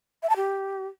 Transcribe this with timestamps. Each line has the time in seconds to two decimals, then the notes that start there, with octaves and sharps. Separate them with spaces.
0.23 E5
0.29 A5
0.36 G4